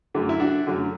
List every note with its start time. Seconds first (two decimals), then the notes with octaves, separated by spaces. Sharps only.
0.14 F#2 D3 F#3 A3
0.29 E4
0.40 D4 F#4
0.67 F#2 D3 F#3 A3